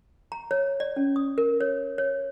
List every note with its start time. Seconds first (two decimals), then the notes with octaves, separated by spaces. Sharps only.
0.32 A#5
0.51 C#5
0.80 D5
0.96 C#4
1.16 D#6
1.38 A#4
1.61 C#5
1.98 C#5